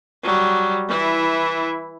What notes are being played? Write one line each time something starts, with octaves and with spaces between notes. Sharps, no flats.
F#3 G3
E3 E4